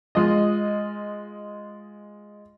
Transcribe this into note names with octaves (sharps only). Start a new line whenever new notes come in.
G#3 F4 D#5